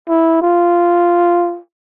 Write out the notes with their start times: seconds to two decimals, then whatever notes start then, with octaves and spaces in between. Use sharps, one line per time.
0.09 E4
0.42 F4